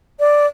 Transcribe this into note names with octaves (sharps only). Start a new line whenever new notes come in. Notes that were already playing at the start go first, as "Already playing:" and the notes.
D5